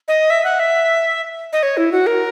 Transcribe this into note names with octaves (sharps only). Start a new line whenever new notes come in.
D#5
E5
F#5
E5
D#5
C#5
E4
F#4
A#4